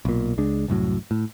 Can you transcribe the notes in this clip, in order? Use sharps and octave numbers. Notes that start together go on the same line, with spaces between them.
B1 A#2
C#2 G#3 D4
C2 F#2 A2 F#3
A2